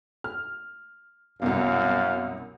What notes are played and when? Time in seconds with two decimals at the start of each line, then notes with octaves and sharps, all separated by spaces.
0.24 F6
1.42 C2 F#2 B2 F5